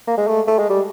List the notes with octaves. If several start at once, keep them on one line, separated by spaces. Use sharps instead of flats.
A#3
G#3
A3
A3
G#3
G3